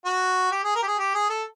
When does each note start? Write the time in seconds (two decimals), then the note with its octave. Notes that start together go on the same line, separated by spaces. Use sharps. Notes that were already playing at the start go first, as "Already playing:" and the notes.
0.05 F#4
0.52 G4
0.64 G#4
0.75 A#4
0.82 G4
0.87 G#4
0.98 G4
1.14 G#4
1.29 A4